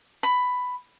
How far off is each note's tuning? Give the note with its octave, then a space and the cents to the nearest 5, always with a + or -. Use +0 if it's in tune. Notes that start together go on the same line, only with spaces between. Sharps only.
B5 +10